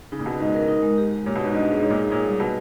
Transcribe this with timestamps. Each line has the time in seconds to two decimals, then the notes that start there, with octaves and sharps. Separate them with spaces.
0.12 C#3 D#4
0.19 A#2
0.26 B2 D#4
0.40 G#2 D#5
0.54 A#4
0.68 D#4
0.83 G#3
0.98 G4
1.11 G4
1.26 A#2 C#5
1.36 B2
1.40 G#2 D#4
1.54 G2 D#5
1.69 G#4
1.82 G#2 C#5
1.90 A#2
1.97 G#2 G#4
2.11 A#2 D#4
2.26 G3
2.39 B2 B4